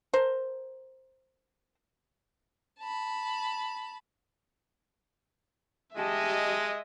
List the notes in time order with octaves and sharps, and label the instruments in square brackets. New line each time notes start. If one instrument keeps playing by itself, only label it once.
[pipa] A#4 C5
[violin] A5 B5
[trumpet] G#3 [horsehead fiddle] G4 A5 [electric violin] D#5 E5